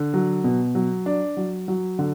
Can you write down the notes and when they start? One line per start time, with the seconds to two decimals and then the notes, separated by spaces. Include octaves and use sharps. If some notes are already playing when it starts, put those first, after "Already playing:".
Already playing: D3
0.14 F#3
0.44 B2
0.75 F#3
1.06 D4
1.37 F#3
1.68 F#3
1.99 D3